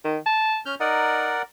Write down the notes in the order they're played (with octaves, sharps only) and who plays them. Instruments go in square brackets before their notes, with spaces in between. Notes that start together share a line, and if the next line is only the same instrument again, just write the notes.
[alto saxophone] D#3
A5
[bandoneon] C#4 F6 G6
[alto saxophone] D#4 [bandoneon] A#4 D5 F#5